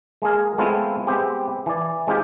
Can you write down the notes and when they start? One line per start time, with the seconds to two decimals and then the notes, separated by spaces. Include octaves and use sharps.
0.22 G#3 A#3 G#4 A#4
0.58 G#3 A3 B3 C4 E4 F4
1.07 G#3 B3 C4 G4
1.66 E3 D5
2.07 G#3 C4 D#4 F4 G4